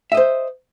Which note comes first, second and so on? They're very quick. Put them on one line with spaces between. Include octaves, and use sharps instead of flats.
E5 D#5 C5